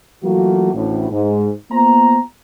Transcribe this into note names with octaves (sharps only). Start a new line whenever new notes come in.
E3 F#3 A3 A#3 F4 F#4
A1 D2 A2
G#2
A#3 B3 F4 C5 A#5